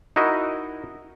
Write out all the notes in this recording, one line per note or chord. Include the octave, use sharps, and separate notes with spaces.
D#4 E4 F#4 A#4 D#5